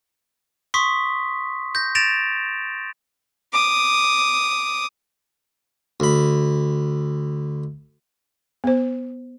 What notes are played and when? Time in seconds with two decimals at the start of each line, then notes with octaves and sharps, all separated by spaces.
0.74 C6 C#6 D#6 B6
1.75 G6 A#6
1.95 A6 A#6 D7 E7 F7
3.53 D6 D#6
6.00 D2 B5
8.64 B3 C5